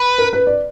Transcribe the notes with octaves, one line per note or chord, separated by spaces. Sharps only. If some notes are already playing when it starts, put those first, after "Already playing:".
Already playing: B4
A#4
B4
D5